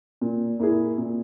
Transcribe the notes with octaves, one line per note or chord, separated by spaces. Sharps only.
A#2
A#3 E4 G#4
A#2